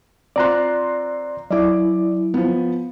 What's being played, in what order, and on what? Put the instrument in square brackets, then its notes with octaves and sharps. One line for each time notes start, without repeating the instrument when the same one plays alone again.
[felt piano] C4 F4 C6 [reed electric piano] D5 A#5 F#6
[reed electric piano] F#3 E4 [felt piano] D5 D6
[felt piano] F3 B3